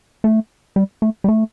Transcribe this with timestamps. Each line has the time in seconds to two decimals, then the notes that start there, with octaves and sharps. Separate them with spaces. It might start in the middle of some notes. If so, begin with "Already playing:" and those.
0.24 A3
0.76 G3
1.02 A3
1.24 G3
1.28 A3